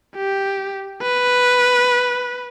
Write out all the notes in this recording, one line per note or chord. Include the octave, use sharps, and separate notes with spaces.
G4
B4